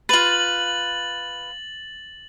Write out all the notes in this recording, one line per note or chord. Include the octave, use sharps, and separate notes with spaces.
F4 B4 A6 F#7